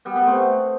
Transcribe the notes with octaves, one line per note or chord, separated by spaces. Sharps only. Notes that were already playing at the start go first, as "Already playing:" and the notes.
G3 B3
G3 B3
A3 C4